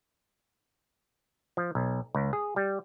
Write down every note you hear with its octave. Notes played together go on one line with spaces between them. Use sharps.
F3
B1
C#2
G#4
G3